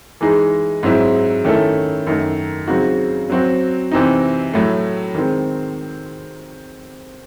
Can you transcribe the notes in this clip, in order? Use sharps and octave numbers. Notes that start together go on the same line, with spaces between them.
E3 G#3 D#4 G#4
G#2 F#3 C4 E4
D#3 A3 C#4 E4 A4
F#2 D#3 A3 D#4
C#3 F#3 C4 D#4 F#4
F#3 C4 F#4
C3 E3 C4 D#4
A2 F#3 A3
D#3 G#3 C4